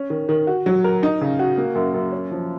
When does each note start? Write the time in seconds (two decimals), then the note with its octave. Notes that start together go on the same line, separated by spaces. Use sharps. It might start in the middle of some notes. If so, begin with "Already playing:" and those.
Already playing: C#4
0.10 D#3
0.29 D#3
0.47 F#4
0.66 F#3
0.84 A#4
1.03 D#4
1.21 C#3
1.39 F#4
1.58 A#3
1.75 F#2
1.94 F#2
2.12 C#4
2.31 F3